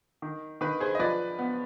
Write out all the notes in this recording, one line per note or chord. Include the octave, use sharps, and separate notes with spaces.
D#3
D#3 B4
G#4 C5
D#5
F3 B4 D5
B3